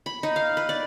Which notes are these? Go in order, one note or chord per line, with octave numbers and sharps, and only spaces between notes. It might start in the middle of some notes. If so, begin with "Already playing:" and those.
B5
D#4
F5
B4
D5